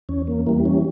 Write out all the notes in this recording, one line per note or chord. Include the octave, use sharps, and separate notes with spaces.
E2 C#4
A#3
E3 G3 A#3
C#4